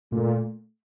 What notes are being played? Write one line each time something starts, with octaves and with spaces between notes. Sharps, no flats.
A#2 A3